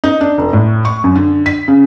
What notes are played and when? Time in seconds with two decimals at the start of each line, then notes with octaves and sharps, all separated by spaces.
0.04 D#4
0.21 D4
0.38 F1
0.53 A2
0.85 C#6
1.04 F#2
1.16 D3
1.46 B6
1.68 C#3